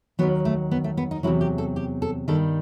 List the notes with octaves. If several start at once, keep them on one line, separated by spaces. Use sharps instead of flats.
D#2 D#3 F#3 B3
A3
B3
A3
B3
D#4
E2 C3 F#3 E4
G4
A4
G4
A4
G2 D#3 G3 A4